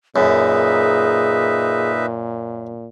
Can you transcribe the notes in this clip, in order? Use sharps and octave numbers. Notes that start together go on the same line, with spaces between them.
F#2 A#2 D#4 G#4 B4 E5